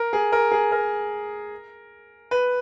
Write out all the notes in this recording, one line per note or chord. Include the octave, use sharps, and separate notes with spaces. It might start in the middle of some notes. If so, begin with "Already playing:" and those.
Already playing: A#4
G#4
A#4
G#4
A#4
B4